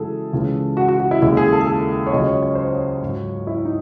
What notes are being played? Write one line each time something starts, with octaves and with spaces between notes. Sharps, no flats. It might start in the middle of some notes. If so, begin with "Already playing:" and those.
Already playing: F#2 C#3 E3 G#3 E4 F#4 G#4 A4
C#2 C#3 E3 G#3
F#4
F#4
F#4
E4
D#2 C#3 G#3 E4
G#4
A4
G#4
A4
C#5
C#2 C#3 F#3 D#5
C#5
C#5
C5
C#5
G#2 F#3
E4
D#4